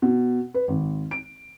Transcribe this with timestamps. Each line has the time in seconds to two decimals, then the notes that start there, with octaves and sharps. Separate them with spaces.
0.02 B2
0.54 B4
0.68 G#1
1.11 D7